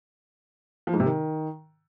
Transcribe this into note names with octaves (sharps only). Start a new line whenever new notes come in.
F3
G#2
C3
D#3